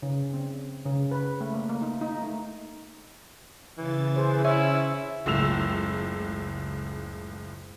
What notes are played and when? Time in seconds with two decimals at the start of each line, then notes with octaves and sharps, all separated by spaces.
0.02 C#3
0.34 C4
0.86 C#3
1.11 B4
1.41 A3
1.54 A#3
1.70 A#3
1.82 D#4
2.01 D#4
2.22 A3
3.78 C#3 E3 A6
4.16 G#4 C5
4.45 C#4 E4 E5
5.26 F#1 C#2 A2 E6 E7 F7